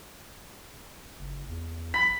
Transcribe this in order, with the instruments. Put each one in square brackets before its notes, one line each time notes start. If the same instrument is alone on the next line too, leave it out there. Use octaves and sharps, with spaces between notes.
[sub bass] F#1
E2
[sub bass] A#1 [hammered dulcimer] B5